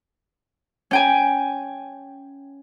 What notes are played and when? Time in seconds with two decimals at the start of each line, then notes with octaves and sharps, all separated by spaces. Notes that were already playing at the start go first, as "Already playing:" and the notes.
0.91 C#4 G5 G#5